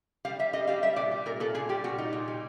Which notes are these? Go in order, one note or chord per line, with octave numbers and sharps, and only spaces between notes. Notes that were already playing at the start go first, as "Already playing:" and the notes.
G3 F5
G3 E5
G3 D#5
G3 F5
G3 E5
A#2 D5
G3
A#2 A#4
A#2 A4
A#2 G#4
G3 G4
A#2 F#4
G3 D#4
A#2
G3